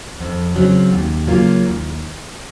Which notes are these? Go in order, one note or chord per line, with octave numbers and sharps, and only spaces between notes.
F2
C#3 F#3 C4
D#2
C#3 F#3 A#3 F4
D#2